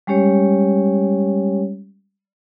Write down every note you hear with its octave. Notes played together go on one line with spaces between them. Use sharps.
G3 G#3 C#4 G4 C#5